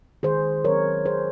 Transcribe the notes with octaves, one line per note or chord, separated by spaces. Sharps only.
D#3 G#4 C5
F#3 C4 A#4 C#5
D#3 G#4 C5